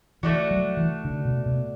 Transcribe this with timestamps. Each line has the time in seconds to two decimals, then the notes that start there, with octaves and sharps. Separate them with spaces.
0.23 E3 A3 D4 F#4
0.51 F#3
0.77 E3
1.05 D3
1.25 B2
1.46 B2